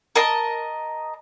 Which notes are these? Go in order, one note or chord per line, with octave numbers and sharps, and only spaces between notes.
A#4 D#5 A5